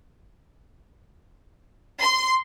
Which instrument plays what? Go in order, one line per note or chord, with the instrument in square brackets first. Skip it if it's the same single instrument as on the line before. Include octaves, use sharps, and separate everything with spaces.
[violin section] C6